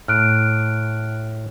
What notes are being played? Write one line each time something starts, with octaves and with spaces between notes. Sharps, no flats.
A2 F6 F#6 D7